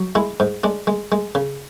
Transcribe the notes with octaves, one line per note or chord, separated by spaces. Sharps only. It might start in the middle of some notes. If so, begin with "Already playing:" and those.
Already playing: F#3
G#3 E4
G#2
G#3 D4
G#3
G#3
C#3